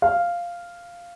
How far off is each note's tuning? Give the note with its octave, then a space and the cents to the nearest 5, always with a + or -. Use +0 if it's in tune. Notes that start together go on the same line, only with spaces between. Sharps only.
F5 -5